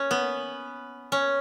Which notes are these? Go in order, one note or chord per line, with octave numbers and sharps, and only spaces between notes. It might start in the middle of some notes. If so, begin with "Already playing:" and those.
Already playing: C#4
B3
C#4